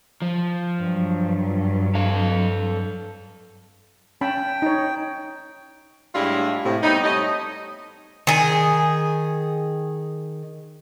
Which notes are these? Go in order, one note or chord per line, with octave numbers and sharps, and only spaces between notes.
F3
G2 F#3
A4 F5
C#4 G5 A5 B5
D#4 C#5
A2 G3 G#3 D4 E4 F4
A2 C3
G3 B3 C4 D#4
G3 A3 C#5 D#5
D#3 G#4